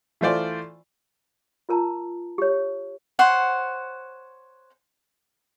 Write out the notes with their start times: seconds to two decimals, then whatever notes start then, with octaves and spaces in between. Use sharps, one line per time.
0.21 E3 A3 F4 C5 D5
1.69 F4 A#4 A5 A#5
2.38 G4 C#5
3.19 C5 C#5 F#5